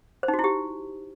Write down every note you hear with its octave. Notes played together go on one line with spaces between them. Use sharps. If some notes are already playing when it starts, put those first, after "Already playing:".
C5
D#4
F#4
E4
G4